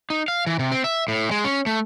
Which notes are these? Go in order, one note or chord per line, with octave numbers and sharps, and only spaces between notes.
D#4
F5
E3
C3
C4
E5
A2
G#3
C#4
A3